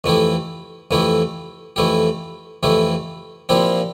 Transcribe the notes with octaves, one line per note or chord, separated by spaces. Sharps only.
F2 E3 A3 E4 G4
F2 E3 A3 E4 G4
F2 E3 A3 E4 G4
F2 E3 A3 E4 G4
A#2 F3 C4 E4 G4